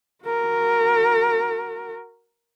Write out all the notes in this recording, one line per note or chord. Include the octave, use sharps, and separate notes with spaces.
F#4 A#4